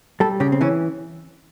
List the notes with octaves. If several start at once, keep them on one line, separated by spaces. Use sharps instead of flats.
G3 A4
C#3 G4
C4
E3 C#4